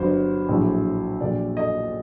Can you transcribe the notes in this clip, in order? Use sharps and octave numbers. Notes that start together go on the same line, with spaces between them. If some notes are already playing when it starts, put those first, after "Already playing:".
Already playing: G1 G2 F#3 C5
A#1 A2 F#3
A#1 A#2 F#3 D5
D#5